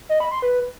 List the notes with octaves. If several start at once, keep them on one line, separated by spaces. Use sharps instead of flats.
D#5
B5
C6
B4